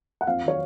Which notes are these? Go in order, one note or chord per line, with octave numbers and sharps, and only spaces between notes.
F#5
F2 F5
D#3 F#3 C#5